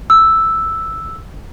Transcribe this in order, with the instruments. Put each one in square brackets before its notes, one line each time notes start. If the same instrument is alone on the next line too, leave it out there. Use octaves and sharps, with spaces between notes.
[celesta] E6